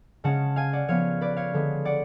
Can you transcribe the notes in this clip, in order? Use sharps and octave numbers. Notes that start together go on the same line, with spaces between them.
C#3 G#3 C#4 F#5 A5
F5 G#5
D5 F#5
F3 B3 C#5 F5
B4 D5
C#5 F5
D3 G#3 B3
D5 F#5